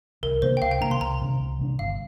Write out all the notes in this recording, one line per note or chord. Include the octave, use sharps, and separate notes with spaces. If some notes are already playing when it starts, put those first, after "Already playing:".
C2 A#4
C3 A#3 D4 C5
G5
C2 F5
G5
C3 A#3 D4 A#5
C6
C2 A#5
C3 A#3 D4
C2
C3 A#3 D4
G1 F5